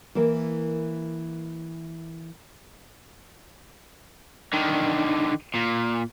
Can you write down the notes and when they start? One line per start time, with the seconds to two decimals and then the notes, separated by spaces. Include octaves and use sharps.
0.15 E3 A#3 E4 A#4
4.53 D3 D#3
5.54 A#2